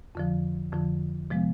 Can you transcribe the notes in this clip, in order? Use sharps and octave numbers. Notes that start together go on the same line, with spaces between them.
F2 D3 F3
F2 D3 F3
C3 F3 G#3 B3